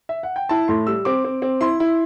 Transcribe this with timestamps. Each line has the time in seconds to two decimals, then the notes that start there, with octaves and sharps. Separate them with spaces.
0.09 E5
0.23 F#5
0.36 G5
0.49 E4 A5
0.68 A2 C6
0.87 G3 E6
1.05 C4 D6
1.24 C4
1.42 C4
1.61 E4 C6
1.80 E4